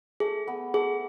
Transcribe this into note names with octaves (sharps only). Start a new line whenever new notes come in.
A3 G#4
B3 G#4
A3 G#4